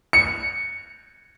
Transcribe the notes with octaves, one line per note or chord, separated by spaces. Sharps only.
C#7